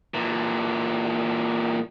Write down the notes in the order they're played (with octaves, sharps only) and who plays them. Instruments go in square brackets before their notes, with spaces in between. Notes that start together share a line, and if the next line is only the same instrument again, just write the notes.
[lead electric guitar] A#2 E3